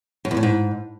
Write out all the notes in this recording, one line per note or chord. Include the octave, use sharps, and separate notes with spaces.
F#2
E2
A2
G#2